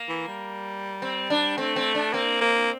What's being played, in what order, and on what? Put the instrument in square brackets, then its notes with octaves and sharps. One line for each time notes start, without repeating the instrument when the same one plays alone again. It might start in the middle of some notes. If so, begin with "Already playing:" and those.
Already playing: [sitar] A#3
[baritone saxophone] E3
G3
[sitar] C4
D4
[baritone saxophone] A3 [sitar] C4
[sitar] C4
D4
[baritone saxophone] A#3 [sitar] C4
[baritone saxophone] A#3